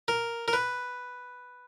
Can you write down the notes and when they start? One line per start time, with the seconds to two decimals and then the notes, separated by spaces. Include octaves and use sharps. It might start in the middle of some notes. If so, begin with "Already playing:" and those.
0.08 A#4
0.48 A#4
0.53 B4